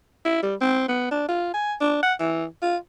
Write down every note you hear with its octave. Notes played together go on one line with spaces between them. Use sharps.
E4
G3
C4
B3
D4
F4
G#5
D4
F#5
E3
F4